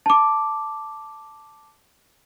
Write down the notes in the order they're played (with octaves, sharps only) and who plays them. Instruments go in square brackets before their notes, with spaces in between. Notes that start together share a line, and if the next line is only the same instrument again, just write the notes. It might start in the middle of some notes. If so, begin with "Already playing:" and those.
[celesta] A5 D6